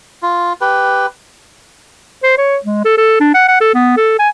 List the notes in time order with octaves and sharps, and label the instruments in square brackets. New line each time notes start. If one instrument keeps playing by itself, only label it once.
[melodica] F4
G4 B4
[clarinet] C5
C#5
G#3
A4
A4
D4
F#5
F#5
A4
B3
A4
G#5